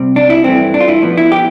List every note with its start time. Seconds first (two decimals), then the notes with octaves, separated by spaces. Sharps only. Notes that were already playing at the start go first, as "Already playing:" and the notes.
Already playing: C3 G3 C4
0.16 D4
0.30 E4
0.44 G2 E3 A3 C4
0.74 D4
0.80 F4
0.88 E4
1.02 A2 F3 B3
1.17 E4
1.32 G4